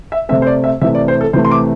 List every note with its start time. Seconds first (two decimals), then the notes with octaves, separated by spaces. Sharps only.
0.12 E5
0.29 C3 A3 C4 E5
0.42 C5
0.47 D5
0.64 E5
0.81 C3 E3 A3 E5
0.95 D5
1.08 C5
1.21 A4
1.33 C3 E3 A3 C5
1.45 C6
1.51 D6